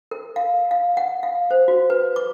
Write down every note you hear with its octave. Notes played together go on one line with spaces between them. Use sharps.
A#4
F5
F5
F#5
F5
C5
F#4
B4
D6